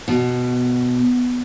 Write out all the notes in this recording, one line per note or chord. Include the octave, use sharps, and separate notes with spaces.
B2